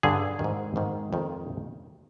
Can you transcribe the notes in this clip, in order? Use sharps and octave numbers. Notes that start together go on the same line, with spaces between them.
G2 D3 G#4
D#3
G#2
G#2 D#3
F2 D#3